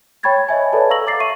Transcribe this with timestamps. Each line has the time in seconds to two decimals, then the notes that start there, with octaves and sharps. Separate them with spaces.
0.23 C#5 G5 B5 C#6 G#6 A6
0.49 C#5 D#5 E5 G#5
0.72 A4 B4 C#5 D5 A5
0.90 F5 A#5 C#6 E6 A#6 F#7
1.07 D6 A6 C7
1.20 E5 C#6 D#7